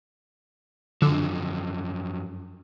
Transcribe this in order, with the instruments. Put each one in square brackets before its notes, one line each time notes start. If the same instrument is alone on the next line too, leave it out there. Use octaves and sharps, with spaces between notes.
[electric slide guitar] F#2 F3 [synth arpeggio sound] D3